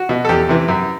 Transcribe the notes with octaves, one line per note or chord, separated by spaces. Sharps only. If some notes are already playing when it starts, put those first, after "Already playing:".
Already playing: F#4
B2
A4
E2 G4
C3 E3
F#2